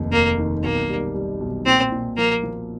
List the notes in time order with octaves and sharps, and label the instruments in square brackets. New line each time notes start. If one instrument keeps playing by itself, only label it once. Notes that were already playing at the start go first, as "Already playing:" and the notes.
Already playing: [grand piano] F1 D#2
[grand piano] F1 [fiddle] A#3
[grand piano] D#3
[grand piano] B1 [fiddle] A#3
[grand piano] G3
G3
B1
[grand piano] A#2 [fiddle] C4
[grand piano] A#2
[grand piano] F3 [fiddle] A#3
[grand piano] F3